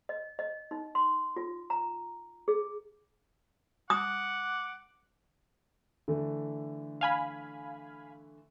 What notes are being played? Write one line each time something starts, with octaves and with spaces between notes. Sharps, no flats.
D#5
D#5
D#4
C6
F4
A#5
G#4
F#5 D6 D#6
D3 E3 A3
F5 G#5 B5